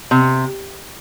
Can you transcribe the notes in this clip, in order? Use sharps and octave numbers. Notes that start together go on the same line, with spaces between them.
C3